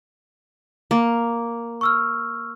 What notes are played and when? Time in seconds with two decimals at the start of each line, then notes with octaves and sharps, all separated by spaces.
0.91 A#3
1.81 C#6 E6 F6